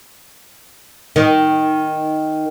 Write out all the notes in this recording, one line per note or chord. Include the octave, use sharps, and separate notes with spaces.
D#3